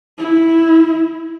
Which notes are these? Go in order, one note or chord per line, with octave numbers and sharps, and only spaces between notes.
E4